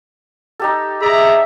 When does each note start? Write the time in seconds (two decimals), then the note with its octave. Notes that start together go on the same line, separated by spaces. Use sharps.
0.60 D#4 G4 A4
1.00 G#4 D5 E5 A#5